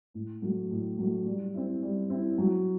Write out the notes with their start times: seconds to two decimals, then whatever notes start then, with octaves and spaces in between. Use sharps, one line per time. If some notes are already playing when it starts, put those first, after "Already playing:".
0.14 A2
0.42 F#3 A3
0.71 A2
0.98 F#3 A3
1.26 G3
1.54 C4 E4
1.82 G3
2.10 C4 E4
2.38 F#3